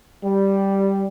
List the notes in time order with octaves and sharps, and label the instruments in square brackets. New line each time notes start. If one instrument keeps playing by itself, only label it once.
[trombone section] G3